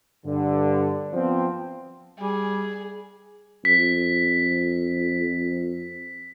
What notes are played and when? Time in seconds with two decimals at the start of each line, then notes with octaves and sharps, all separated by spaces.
0.25 G2 D3
1.12 F3 B3 C4
2.19 G3 G#4
3.65 F2 B6